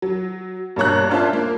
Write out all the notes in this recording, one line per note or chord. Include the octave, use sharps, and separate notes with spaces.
F#3
G2 B2 A#3 C#5 A#5 F#6
C#4 D4 F4 C5 E5 A5
A#3